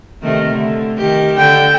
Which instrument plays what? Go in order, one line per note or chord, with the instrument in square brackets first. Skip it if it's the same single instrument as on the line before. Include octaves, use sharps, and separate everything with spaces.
[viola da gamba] C3 D#3 A3
D3
D#3 G4
[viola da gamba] D3 [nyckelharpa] G5